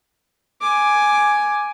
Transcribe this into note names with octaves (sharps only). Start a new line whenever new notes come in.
G#5 D6